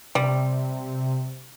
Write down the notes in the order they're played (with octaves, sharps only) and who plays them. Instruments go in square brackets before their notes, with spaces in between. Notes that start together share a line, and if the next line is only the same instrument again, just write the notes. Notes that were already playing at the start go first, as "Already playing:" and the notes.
[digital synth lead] C3 [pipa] G3